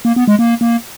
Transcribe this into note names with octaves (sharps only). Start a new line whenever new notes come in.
A#3
B3
G#3
A#3
A#3